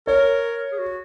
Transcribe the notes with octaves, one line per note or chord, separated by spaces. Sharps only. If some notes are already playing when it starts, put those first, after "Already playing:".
A#4 C#5
G#4
F#4